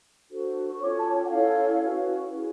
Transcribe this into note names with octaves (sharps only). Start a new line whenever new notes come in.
D4 F#4 A4 C5
C#6
C#4 F4 A4 C#5 D6
A5
G5
F#5
C#4 E4 A4 C#5 F5
C#4 F#4 B4
C#4 E4 G#4